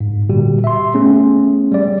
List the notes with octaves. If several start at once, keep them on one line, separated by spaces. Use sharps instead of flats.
G#2
A#2 D3 G3 F#4 G4
E5 C6
A3 B3 C#4 G#4
G3 D5